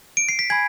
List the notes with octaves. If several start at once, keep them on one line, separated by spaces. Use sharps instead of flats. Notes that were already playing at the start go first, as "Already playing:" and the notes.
D7
C7
B6
G#5 B5 G#6